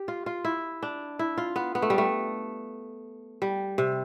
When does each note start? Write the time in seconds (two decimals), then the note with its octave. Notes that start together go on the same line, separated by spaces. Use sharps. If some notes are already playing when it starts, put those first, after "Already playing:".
Already playing: G4
0.08 F4
0.26 F4
0.45 E4
0.83 D4
1.19 E4
1.38 F4
1.56 B3
1.75 B3
1.82 A3
1.90 G3
1.98 A3
3.42 G3
3.78 C3